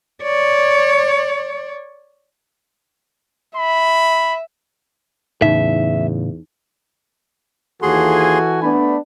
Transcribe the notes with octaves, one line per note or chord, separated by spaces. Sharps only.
C#5 D5
E5 B5
E2 A2 C#3 D#4 E5
D#2 E3 F#4 G#4 A4 G#5 C6
A3 B3 D4 B5